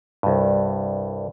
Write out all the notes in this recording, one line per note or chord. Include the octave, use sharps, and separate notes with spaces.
C2 G2